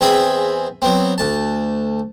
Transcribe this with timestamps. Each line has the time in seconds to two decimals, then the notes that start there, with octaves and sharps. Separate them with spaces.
0.01 E2 C4 G#4 E5 B5
0.82 F#3 B3 C4
1.18 D2 A5